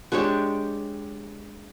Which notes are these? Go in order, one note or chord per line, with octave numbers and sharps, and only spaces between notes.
G#3 D4 G4 C#5